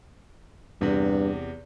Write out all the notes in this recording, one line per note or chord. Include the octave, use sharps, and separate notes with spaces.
E2 G2 C3